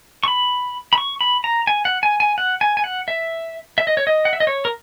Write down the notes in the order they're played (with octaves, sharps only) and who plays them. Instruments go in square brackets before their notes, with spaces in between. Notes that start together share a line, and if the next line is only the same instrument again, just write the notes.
[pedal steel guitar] C#6
B5
B5
C#6
B5
A#5
G#5
F#5
G#5
G#5
F#5
G#5
G#5
F#5
E5
E5
D#5
C#5
D#5
F#5
E5
D#5
C#5
A#4